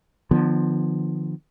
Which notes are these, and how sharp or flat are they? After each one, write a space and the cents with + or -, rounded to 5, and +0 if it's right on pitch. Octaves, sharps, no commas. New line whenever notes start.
D3 +40 F3 +0 B3 +0